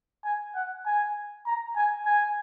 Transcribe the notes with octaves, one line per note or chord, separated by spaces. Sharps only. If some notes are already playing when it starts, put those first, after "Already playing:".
G#5
F#5
G#5
A#5
G#5
G#5